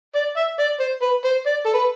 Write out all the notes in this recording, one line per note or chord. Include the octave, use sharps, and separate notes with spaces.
D5
E5
D5
C5
B4
C5
D5
A4
B4